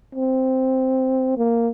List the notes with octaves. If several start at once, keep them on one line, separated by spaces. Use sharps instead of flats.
C4
A#3